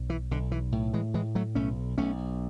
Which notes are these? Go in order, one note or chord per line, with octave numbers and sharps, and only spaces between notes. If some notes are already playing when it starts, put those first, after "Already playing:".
Already playing: B1
E3
B1 D3
E3
A2
E3 G#3
A2 E3 G#3
F#3 A3
B1 A3 C#4
B1 A3 C#4